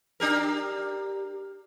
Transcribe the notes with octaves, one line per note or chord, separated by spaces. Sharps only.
D4 G4 A#4